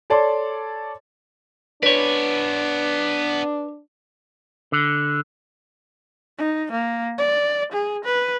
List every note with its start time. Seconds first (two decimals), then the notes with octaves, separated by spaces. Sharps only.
0.10 A4 C#5 D5 A5 C6
1.83 B3 D4 B4 C#5 D5
4.72 D3
6.38 D#4
6.72 A#3
7.18 D5
7.72 G#4
8.05 B4